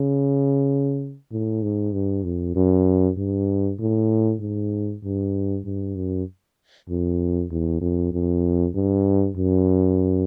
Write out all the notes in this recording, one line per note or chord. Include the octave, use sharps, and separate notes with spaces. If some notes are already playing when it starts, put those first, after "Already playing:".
Already playing: C#3
A2
G#2
G2
F2
F#2
G2
A2
G#2
G2
G2
F#2
F2
E2
F2
F2
G2
F#2